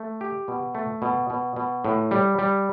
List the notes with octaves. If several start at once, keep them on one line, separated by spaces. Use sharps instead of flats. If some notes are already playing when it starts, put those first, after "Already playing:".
Already playing: A3
G4
B2
A3
B2
B2
B2
A2
G3
G3